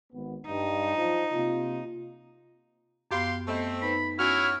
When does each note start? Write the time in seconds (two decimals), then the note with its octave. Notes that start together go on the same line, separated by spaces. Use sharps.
0.13 G#1 B3
0.47 G2 D#4
0.96 F3
1.32 C3 A#3 F4
3.11 F#2 B3 G4 F5 C6
3.48 A3 B3 C4 D#5 G6
3.82 D#4 B4 B5
4.18 C#4 E4 F#4 F6